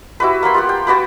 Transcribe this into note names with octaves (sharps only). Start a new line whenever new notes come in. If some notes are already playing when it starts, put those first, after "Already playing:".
E4 F#4 G4 B4
A#3 B3 B5 C6
F4 G4 F#5
G5
B3 F#4 G4 B4